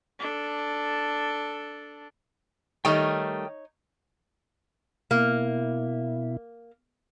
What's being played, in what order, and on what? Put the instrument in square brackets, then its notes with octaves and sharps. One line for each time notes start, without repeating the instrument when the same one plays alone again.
[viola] D4 A4
[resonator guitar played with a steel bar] D#3 G3 A3 [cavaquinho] D#4 C#5 [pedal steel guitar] G5 D#6 F6
[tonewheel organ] B2 E4 [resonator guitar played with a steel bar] A#3